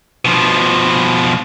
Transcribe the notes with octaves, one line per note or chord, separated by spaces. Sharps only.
B2 F3